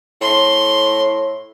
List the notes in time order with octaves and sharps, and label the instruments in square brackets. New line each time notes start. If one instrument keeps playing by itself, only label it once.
[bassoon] A2 [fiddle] C6